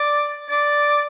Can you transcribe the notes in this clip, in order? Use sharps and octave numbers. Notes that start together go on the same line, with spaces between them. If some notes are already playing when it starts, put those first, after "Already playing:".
Already playing: D5
D5